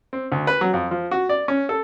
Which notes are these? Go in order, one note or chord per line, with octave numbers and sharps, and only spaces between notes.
C4
D2
B4
F#3
F2
F3
F#4
D5
C#4
A4